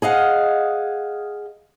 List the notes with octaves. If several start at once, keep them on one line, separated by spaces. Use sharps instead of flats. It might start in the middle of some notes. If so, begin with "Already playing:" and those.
G#4 D#5 F5 F#5